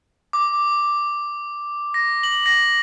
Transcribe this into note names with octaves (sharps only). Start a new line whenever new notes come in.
D6
A#6
F#7
A#6